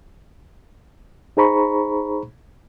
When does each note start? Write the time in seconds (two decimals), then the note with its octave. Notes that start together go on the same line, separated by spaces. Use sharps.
1.37 D#4 G#4 C5 A#5 B5 C#6